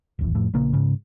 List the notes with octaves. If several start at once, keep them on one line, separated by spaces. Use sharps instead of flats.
D1 G#1 E2
F2 A2
A#1 C#3 A#3
G#2 C#3